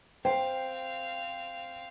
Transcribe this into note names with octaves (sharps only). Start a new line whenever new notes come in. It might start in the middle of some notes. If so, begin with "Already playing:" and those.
C4 C5 F5 G5